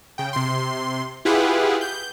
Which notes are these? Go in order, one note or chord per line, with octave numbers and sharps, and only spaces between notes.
C#3 G5
C3 C6
E4 F4 G4 G#4 B4 F#5
G6